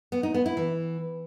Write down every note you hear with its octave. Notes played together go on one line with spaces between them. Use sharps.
B3
D#4
B3
E4
E3